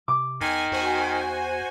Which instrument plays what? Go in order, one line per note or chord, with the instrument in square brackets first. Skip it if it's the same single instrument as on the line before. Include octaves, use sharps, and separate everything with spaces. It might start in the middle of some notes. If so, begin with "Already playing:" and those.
[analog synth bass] C3 [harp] D6
[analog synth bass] E2 [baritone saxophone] D#3 [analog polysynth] G#5
[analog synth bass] E2 [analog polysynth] F#4 C5 G#5